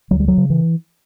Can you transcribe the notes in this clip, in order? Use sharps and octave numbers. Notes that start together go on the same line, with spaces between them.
D2 F#3
G3
F#3
C#3
E3